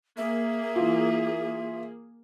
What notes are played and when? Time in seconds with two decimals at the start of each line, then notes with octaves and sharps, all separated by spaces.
0.17 A#3 G#4 E5
0.76 E3 F4